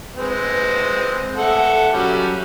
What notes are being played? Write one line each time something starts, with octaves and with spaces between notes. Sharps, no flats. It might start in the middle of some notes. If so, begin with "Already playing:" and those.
G#3 C4 B4
A4 E5 F#5
F#3 G3 C#4